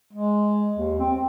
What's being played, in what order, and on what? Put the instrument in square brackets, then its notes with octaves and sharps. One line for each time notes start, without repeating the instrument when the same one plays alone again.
[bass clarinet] G#3
D#2
C4